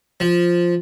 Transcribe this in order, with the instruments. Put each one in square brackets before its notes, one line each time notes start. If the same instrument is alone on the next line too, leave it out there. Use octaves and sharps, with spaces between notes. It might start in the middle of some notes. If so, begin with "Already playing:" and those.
[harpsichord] F3